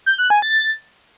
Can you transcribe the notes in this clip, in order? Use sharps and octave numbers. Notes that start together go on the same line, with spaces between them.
G6
F#6
G#5
A6